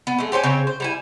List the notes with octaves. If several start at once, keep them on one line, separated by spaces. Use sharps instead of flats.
B3
G#3 A3
G4 C5 C#5 G#5
C#3 C4 C#5
C5
G3 E4 G#5